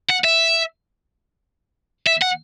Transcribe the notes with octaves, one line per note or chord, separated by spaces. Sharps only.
F#5
E5
E5
F#5